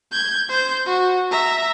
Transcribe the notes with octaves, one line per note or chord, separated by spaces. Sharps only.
G6 G#6
C5 G6
F#4
E5 A#5